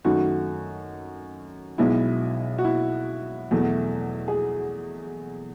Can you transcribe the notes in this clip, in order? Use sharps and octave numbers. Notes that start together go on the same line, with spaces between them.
F#2 D#3 A3 D#4 F#4
B1 B2 G#3 B3 E4
F#4
E4
E2 B2 F#3 A3
G#4